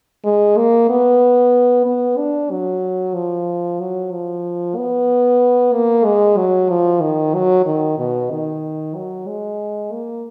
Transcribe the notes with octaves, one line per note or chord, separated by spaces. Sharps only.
G#3
A#3
B3
B3
D4
F#3
F3
F#3
F3
B3
A#3
G#3
F#3
F3
D#3
F#3
D#3
B2
D#3
F#3
G#3
A#3